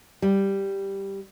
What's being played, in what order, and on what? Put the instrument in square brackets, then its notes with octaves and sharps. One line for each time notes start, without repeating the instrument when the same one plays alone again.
[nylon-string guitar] G3